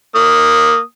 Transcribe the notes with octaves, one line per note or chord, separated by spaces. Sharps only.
A#3 D#6